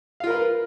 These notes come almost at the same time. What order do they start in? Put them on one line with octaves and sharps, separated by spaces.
F5 F4 A#4 B4